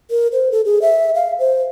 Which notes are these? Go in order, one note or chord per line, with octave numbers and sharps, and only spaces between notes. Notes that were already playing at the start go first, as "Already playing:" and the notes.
A#4
C5
A4
G#4
E5
F5
C5